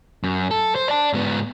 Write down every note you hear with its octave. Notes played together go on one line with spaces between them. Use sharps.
F#2
A4
C5
D5 A5
G#2 B3